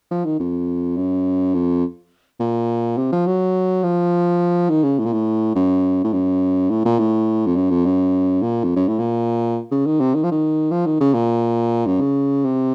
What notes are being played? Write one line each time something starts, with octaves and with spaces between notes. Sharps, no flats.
F3
D#3
F2
F#2
F2
A#2
C3
F3
F#3
F3
D#3
C#3
A2
A#2
A2
F#2
A2
F#2
A2
A#2
A2
F2
F#2
F2
F#2
A#2
F2
F#2
A2
A#2
C#3
D#3
C3
D#3
F3
D#3
F3
D#3
C#3
A#2
F#2
C#3
C3